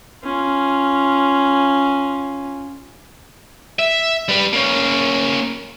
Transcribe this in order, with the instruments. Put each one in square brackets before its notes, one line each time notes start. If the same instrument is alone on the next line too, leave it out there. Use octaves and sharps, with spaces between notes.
[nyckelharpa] C#4 F4
[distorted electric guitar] E5
G3 B4
A#3 C#4